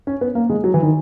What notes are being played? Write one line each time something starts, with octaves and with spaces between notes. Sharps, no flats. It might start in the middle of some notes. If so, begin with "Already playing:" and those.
C#4
B3
A#3
G#3
F#3
E3
D#3